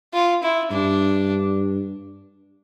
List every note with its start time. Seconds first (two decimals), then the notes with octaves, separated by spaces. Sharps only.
0.14 F4
0.43 E4
0.71 G2 D4